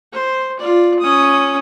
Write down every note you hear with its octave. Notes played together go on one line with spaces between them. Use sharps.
C5
F4 D5
C#4 D#6